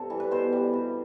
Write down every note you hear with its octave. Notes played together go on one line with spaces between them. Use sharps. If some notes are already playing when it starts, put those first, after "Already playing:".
Already playing: G2 C3 A4
E3 G3
B4
B2 C5
G3
C3